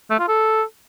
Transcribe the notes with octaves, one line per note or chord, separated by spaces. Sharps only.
A3
F4
A4